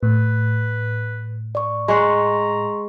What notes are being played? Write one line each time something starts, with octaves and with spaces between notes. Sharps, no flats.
A2 B4
D5 C#6
G#3 F#5 A#5 C6 C#6